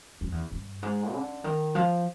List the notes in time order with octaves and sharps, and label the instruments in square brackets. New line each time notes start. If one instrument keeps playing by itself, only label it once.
[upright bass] F2
E2
G2
G#2
D3
D#3
F3